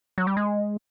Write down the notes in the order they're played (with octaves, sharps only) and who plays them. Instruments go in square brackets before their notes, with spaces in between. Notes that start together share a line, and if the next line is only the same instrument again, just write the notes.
[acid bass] F#3
G3
G#3